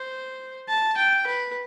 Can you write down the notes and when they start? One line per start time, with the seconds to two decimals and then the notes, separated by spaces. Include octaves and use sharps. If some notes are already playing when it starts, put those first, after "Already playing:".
Already playing: C5
0.68 A5
0.97 G5
1.27 B4